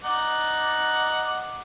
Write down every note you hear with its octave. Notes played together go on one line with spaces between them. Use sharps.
D#4 D5 F#5